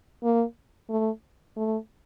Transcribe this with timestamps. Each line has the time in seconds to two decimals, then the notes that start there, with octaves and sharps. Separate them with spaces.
0.23 A#3
0.90 A3
1.56 A3